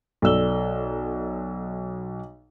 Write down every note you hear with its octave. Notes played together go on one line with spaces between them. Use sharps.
B1 A4 D5 E6 G7